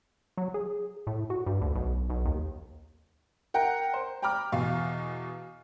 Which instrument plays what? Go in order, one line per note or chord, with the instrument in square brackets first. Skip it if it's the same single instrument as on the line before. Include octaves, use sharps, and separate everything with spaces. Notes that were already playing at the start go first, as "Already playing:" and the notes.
[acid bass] F#3
G#4
A2
F#4
G2
D2
B1
B1
D#2
[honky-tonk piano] A#4 F#5 G5 A#5
C5
G5 A#5 B5 D6 F6
E2 B2 F5